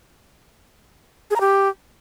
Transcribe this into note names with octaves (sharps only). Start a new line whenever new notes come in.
G#4
A#5
G4